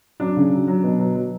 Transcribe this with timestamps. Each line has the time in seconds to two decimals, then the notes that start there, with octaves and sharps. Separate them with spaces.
0.20 F#3 D4
0.37 C#3
0.52 F#3
0.68 F#3
0.84 B2
0.99 F#3
1.15 F#3